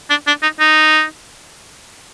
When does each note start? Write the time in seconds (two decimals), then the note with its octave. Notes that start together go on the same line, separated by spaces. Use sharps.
0.10 D4
0.27 D4
0.42 D#4
0.60 D#4